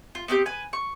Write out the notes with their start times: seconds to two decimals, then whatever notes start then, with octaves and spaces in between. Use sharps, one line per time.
0.15 F4
0.28 B3 C4 D#4 G4
0.46 B4 G#5
0.73 C#6